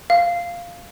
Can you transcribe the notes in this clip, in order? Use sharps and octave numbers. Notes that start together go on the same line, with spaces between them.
F5